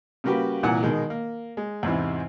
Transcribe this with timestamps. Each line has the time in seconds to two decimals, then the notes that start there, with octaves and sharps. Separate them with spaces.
0.24 C#3 G3 A#3 F#4 G4 B4
0.63 C2 A#2 E3 F#5 G#5
0.83 B2 D#3 G#3
1.10 A#3
1.57 G#3
1.83 E2 G#2 C3 E4